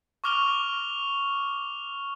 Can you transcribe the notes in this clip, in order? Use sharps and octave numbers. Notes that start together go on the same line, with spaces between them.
C#6 D6 F6 F7 G7